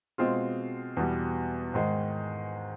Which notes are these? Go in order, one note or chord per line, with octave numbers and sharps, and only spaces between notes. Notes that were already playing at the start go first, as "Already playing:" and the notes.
B2 G#3 C4 F4
E2 B2 G3
G#2 D#3 G#3